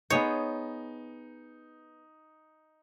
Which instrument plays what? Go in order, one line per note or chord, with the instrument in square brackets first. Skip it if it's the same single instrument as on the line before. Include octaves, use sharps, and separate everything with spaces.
[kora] B3 G#4 C5 [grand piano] D#4 [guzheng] C#5